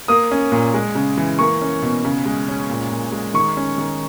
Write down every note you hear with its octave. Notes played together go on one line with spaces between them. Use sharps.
A#3 D#6
C#4
A#2
G#3
C#3
E3
A#3 C#6
C#4
B2
C#3
G#3
C#4
A#2
A#2
G#3
D#3 C#6
C#4
D#3